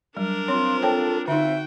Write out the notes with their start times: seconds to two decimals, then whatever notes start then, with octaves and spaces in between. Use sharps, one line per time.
0.17 F#3 G3 D4 A#4
0.48 C4 F4 C#5 C6
0.83 A4 C#5 G5 A5
1.28 D3 D#4 F#4 E5 G5